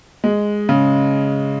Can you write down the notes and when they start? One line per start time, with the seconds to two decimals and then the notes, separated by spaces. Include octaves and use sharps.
0.24 G#3
0.69 C#3